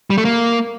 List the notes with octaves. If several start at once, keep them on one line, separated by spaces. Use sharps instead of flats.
G3
A3
A#3